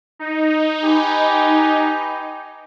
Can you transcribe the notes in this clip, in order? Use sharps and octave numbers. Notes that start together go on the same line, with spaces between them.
D#4
G4 B4 G#5